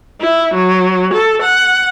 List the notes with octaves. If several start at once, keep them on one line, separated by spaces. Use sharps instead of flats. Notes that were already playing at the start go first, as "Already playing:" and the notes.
E4
F#3
A4
F#5